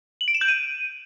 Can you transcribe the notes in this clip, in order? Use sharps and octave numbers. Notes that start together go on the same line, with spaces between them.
F#7
D7
E7
G6
D#7